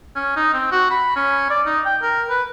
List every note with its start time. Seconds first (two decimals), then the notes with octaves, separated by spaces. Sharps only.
0.15 C#4
0.36 D#4
0.53 C4
0.72 F#4
0.90 B5
1.16 C#4
1.50 D5
1.66 D#4
1.85 G5
2.02 A#4
2.29 B4